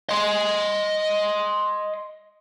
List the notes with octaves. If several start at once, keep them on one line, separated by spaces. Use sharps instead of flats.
D#5 C6